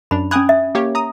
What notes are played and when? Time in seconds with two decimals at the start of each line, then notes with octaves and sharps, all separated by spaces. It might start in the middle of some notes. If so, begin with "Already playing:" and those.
0.11 F#2 D4 B5
0.31 C#4 G#5 B5 D#6 F#6 G#6
0.49 E5
0.75 A#3 G4 C#5
0.95 A#5 D#6